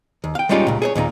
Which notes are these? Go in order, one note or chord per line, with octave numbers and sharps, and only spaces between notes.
D#2
F5 G5
G3 G#3 C#4 D#4 F4 G4
C#2 A#2
G#4 A4 C#5
D#2 A#2 C#4 D#4